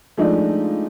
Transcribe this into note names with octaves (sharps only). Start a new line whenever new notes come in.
F3 G#3 A3 D4 D#4